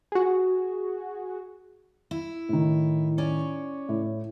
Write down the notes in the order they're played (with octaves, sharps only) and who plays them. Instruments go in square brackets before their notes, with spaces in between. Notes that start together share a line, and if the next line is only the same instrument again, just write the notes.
[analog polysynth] F#4 G#4
[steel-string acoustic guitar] E4
[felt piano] A2 D#3
[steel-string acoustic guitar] C#4 C#5 D5
[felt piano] A2